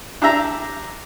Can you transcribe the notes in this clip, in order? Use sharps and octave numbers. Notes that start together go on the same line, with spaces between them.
D4 G4 E5 A#5